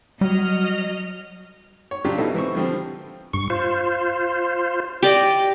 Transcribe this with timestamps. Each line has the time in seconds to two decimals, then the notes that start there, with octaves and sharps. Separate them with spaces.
0.21 F#3 G3 D#5 F6
1.91 C#5
2.04 C#3 F#3 D4 F4 G4
2.18 B2 A3 D#4 E4 A4
2.34 E3 C4 C#6
2.55 D3 F3 G3 C4
3.33 G2 C#6
3.50 F4 C5
5.02 G4 D5 D#5